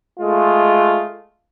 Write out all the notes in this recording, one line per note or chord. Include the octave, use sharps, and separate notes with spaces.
G#3 A3 F4